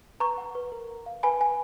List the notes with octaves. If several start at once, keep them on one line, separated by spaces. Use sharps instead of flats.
B4 A#5 C#6
F#5
B4
A#4
A#4
F5
B4 G#5 B5
B4 G#5